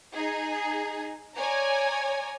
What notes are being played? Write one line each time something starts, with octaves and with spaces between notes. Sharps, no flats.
D#4 G#4
C#5 D5 G#5 A#5